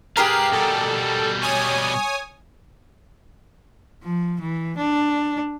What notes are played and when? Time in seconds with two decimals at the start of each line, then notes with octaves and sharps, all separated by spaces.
0.17 G4 G#4 A#4 B4 F5 C7
0.53 B2 G3 A4
1.42 C#5 G#5 D#6
4.04 F3
4.41 E3
4.77 D4